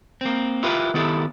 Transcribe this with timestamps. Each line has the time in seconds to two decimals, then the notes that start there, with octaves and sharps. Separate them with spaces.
0.21 A#3 C4
0.63 E4 F4 G4 A#4 B4
0.94 D#3 B3 E4 G4 A4